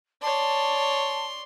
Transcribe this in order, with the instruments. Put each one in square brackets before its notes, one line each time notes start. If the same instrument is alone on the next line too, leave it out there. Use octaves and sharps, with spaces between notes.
[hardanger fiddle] C#5 D5 [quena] A5 [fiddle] C6